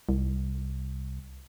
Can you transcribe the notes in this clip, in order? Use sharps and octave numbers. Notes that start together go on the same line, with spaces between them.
C2